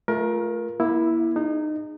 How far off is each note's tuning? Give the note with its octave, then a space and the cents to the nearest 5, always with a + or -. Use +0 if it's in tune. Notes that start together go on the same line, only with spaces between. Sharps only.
A3 -15 F4 +0 A#4 +25
A#3 +35 E4 +0
D#4 -25 G#4 -15